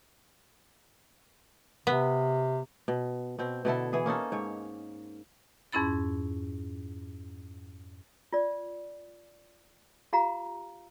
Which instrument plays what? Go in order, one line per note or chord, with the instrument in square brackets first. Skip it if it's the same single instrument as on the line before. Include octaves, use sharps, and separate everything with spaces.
[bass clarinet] C3 [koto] B3
[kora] B2
B2 C4
B2 D3 E4 A4
E3 G#4
A#3 C#4 D#4 A4
G#2 C#5
[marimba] F2 G#2 C#4 E4 B5 A6
[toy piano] F4 D5
F4 G4 F5 A#5